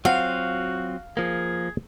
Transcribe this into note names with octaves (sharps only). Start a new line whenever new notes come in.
F#3 C4 F4 F#4 F5 F#5
F3 A#3 G#4